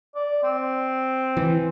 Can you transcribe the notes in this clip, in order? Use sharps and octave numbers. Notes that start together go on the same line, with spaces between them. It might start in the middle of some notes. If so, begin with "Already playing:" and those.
D5
C4
E3